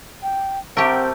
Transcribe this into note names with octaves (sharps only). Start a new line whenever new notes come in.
G5
A3 C4 G4 A#4 F#5